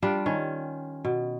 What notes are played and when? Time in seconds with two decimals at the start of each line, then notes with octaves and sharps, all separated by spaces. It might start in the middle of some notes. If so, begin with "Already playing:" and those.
0.02 G3 D4 F4
0.26 D#3 C#4
1.05 B2